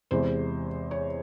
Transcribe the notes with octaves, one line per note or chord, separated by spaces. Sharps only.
E2 C3 E3 G#3 C5
C#5